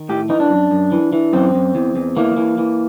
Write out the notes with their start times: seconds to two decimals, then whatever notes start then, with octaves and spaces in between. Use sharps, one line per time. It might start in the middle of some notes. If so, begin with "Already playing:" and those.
Already playing: D#3
0.09 A2 G4
0.29 E3 D#4
0.40 D4
0.50 F#2
0.71 F#2
0.92 E3
1.13 E3
1.33 F#2 C4
1.55 F#2
1.75 E2
1.96 E2
2.17 E3 A#3
2.37 E3
2.58 E3